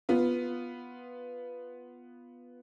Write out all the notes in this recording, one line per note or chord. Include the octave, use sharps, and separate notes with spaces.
B3 F4